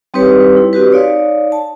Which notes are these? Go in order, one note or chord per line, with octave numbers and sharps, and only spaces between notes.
G3 C4 D#4 G4 B4 C#5
E4
C4 F#4 G4 B4
D#4 C#5 D5 F5
A5